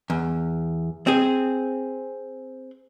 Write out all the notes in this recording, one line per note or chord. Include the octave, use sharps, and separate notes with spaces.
E2
C4 G#4